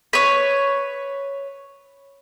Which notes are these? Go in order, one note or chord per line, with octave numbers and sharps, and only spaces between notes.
B4 C#5